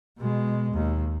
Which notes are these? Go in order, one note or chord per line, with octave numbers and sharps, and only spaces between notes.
B2 G#3
D#2